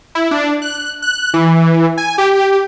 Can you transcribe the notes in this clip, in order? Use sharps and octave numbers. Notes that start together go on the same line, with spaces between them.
E4
D4
F#6
F#6
E3
G#5
G4